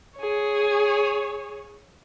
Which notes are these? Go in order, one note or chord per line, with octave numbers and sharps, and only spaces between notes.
G#4 C#5